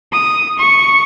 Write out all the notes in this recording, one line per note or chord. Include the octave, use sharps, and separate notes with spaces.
D#6
C#6